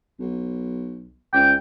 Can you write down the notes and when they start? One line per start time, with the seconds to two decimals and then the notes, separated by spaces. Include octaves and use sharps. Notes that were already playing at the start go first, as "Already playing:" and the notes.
0.19 B1
1.33 C#2 G5